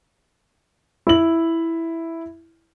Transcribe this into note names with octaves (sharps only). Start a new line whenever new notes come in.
E4 F#7